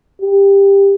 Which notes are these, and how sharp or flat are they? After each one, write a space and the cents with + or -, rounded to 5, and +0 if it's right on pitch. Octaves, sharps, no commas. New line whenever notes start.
G4 +15